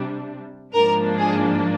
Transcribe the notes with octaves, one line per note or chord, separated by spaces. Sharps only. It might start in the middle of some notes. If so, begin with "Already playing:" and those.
Already playing: C3 G3 D4
G#2 F3 A#3 D4 A#4
G#4